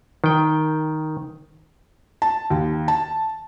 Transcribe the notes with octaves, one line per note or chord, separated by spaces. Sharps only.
D#3 G5
A5
D#2
A5